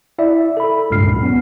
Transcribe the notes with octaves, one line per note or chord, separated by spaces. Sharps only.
E4 D5 E5
A4 B5
C#2 G2 A#2 F6 C7
F#2
B3 C#4